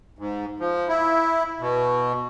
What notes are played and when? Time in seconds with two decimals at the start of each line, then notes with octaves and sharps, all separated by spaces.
0.19 G#2
0.60 F3
0.89 E4
1.60 B2